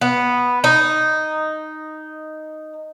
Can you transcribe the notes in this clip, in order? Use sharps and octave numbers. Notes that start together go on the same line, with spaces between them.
B3
D#4